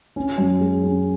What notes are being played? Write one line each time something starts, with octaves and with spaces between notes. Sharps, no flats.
C#4
F#2
G#3
C#4